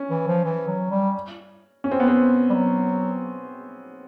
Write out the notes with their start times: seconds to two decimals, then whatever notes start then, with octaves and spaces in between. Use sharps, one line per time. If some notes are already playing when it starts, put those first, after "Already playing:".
Already playing: C#4
0.10 E3
0.27 F3
0.44 E3
0.68 F#3
0.91 G3
1.84 C#4
1.91 C4
2.00 B3
2.08 C4
2.50 G3
2.54 F#3